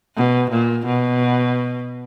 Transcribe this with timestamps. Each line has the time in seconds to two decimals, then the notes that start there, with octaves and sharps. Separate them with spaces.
0.16 B2
0.51 A#2
0.86 B2